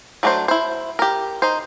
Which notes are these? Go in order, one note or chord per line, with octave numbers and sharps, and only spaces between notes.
F#3 A3 D4 F#4 C5
E4 C5
G4 A#4
D#4 C5